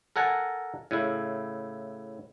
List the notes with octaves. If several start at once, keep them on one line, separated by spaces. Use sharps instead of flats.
A4 A#4 F#5 G#5 A5
A2 C#3 E4